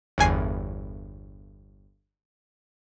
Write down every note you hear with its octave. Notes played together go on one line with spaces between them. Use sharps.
G1 E2 G#5 C7